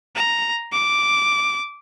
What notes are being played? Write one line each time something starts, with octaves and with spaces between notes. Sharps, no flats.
A#5
D6